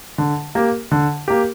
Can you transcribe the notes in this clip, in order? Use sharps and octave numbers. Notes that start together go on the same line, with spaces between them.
D3
A#3 G4
D3
A#3 G4